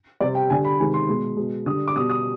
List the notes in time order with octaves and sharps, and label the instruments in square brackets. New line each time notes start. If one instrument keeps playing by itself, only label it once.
[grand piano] C3 G3 D5
G5
D3 G3 G#5
B5
C3 D#3 G#3 G#5
C6
B2 G#3
B2 G#3
D3 G3 D#6
D6
B2 G3 D#6
D#6